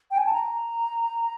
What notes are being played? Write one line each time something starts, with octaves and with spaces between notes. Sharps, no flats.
G5
G#5
A5
A#5